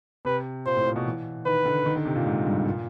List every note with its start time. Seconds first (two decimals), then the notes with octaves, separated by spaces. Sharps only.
0.25 C3 B4
0.66 A#2 C5
0.76 A2
0.86 A#2
0.96 B2
1.06 E3
1.45 D#3 B4
1.65 D3
1.86 D#3
1.96 D3
2.05 C3
2.16 A#2
2.26 G#2
2.46 G2
2.65 A#2